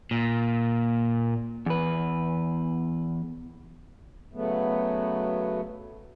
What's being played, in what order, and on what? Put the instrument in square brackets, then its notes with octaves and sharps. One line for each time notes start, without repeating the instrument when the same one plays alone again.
[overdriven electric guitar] A#2
[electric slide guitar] E2 B4
[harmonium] C#3 F#3 A3 B3